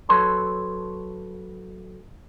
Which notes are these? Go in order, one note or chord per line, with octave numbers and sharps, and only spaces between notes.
F#3 A4 B4 C#5 A5 C6